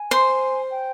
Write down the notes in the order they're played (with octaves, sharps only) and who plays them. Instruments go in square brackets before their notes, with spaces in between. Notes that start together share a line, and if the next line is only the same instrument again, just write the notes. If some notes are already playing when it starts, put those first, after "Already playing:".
Already playing: [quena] G#5
[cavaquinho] C5 C6
[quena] G5